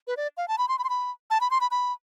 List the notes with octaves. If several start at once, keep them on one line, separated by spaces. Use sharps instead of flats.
B4
D5
F5
A5
B5
C6
B5
C6
B5
A5
B5
C6
B5
B5